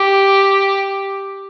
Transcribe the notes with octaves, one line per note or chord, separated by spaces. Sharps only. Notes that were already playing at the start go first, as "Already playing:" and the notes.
Already playing: G4